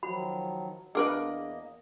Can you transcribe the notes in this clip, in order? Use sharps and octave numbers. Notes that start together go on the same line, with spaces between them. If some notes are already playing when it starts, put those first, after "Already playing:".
D#3 F3 F#3 F#4 B5
E2 A#3 D4 G#4 A#4 B4 D#5